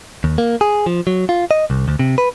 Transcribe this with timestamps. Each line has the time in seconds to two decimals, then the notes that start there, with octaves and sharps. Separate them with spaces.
0.24 D#2
0.38 A#3
0.61 G#4
0.86 F3
1.07 F#3
1.29 F4
1.51 D#5
1.70 C2
1.88 D2
1.99 C3
2.18 B4